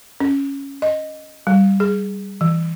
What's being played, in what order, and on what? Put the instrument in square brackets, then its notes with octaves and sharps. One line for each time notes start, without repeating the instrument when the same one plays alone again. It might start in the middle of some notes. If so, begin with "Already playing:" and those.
[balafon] C#4
D#5
G3
G#4
E3